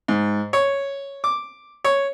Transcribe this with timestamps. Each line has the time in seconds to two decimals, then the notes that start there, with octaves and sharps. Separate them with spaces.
0.08 G#2
0.53 C#5
1.24 D6
1.84 C#5